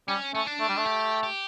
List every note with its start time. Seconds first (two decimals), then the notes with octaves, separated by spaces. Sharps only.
0.08 G3 C#4
0.34 A3 C#4
0.46 D4
0.60 A3
0.69 G3
0.77 A3
0.85 G4
1.23 G4